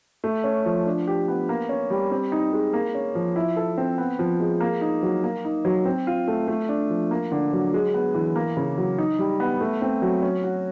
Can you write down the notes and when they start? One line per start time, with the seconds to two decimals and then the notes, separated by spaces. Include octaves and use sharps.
0.24 A3
0.44 C#4
0.65 F3
0.86 D4
1.07 G4
1.28 B3
1.49 A#3
1.69 C#4
1.90 G3
2.11 C4
2.32 D#4
2.53 G#3
2.73 A#3
2.95 C#4
3.15 F3
3.36 E4
3.57 A4
3.78 C4
3.98 B3
4.19 F3
4.40 G#3
4.60 A#3
4.81 D#4
5.03 F#3
5.24 A#3
5.45 D#4
5.65 F#3
5.85 C4
6.07 F4
6.28 A3
6.48 A3
6.69 D4
6.90 F3
7.11 A#3
7.32 D3
7.53 F#3
7.74 G#3
7.94 B3
8.14 E3
8.36 A#3
8.57 C#3
8.78 F#3
8.99 D#4
9.19 G3
9.40 B3
9.61 A3
9.82 C4
10.02 F#3
10.23 C#4
10.44 F#4